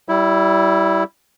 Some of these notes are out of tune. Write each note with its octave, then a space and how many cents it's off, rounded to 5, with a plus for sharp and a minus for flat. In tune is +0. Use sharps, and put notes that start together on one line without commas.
G3 -25 E4 +0